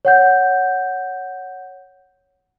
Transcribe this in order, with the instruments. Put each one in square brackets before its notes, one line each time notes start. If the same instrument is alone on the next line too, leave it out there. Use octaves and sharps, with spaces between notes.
[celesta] C#5 F#5 G6